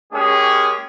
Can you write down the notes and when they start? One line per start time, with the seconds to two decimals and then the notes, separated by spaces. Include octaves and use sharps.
0.13 G#3 A#3 C#4 G4 G#4 C#5